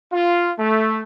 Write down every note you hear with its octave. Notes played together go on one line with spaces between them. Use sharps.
F4
A3